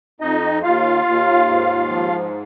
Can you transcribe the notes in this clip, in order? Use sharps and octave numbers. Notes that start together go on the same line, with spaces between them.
F2 D#4 D#5
D#2 F4 F5
D#2
G#2
F3